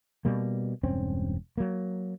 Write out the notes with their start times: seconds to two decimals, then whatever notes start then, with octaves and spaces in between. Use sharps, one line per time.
0.25 B2 G3 A#3
0.83 E1 G2 C4 C#4
1.58 F#3 A#3